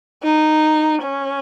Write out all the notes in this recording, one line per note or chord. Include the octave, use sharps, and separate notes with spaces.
D#4
C#4